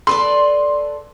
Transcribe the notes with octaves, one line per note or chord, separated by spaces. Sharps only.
A4 B4 D5 C6